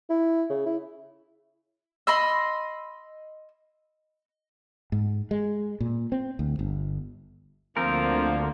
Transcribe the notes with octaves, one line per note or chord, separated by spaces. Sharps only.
E4
C#3
E4
D#5 B5 C6 E6
G#2
G#3
A#2
C4
D2
G1
D2 D3 F3 A#3 C4 A#4